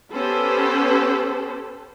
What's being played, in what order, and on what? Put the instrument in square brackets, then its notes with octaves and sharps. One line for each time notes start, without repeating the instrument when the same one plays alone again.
[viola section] B3 C#4 G4 A4 C5